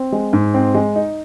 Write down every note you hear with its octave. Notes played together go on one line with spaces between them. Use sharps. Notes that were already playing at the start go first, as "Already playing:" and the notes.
Already playing: C4
G#3
G#2
C4
G#3
D#4